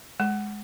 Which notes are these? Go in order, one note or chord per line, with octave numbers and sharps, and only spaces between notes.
G#3